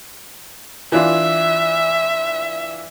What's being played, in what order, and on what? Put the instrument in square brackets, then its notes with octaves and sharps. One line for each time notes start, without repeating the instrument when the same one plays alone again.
[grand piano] E3 D4 F4 [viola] E5